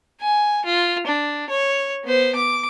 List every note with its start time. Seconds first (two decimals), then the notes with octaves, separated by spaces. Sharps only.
0.21 G#5
0.65 F4
1.07 D4
1.50 C#5
2.04 B3 C5
2.36 D6